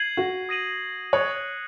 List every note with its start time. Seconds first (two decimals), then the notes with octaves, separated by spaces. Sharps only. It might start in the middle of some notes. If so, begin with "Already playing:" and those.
Already playing: G#6 C7 D#7 F#7
0.17 F#4
0.49 D#6 A#6 D#7 F#7
1.13 C#5 D#6 F#6 C#7 F#7